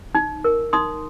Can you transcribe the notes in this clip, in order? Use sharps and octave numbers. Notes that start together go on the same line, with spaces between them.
D#4
A#4
D#4 C6 D#6